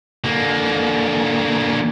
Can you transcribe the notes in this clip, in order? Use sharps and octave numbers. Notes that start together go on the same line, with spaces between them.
D3 A#3